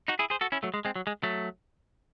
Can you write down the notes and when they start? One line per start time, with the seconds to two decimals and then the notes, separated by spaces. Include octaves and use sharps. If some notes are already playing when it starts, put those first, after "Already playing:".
0.08 D#4 F#4
0.19 E4 G#4
0.30 G#4 C5
0.41 F#4 A4
0.52 C#4 E4
0.63 F#3 A3
0.74 G#3
0.85 G#3 C4
0.96 F#3
1.07 G#3
1.23 F#3 A3